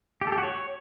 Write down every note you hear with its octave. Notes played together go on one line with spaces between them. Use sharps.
G4
A4
G4
F#4
C#5